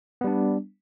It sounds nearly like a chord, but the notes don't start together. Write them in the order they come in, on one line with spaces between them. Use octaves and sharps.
B3 G3 D4